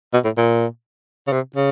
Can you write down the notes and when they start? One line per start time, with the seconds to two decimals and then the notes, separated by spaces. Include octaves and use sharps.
0.13 B2
0.24 A2
0.37 A#2
1.27 C#3
1.32 C3
1.56 C#3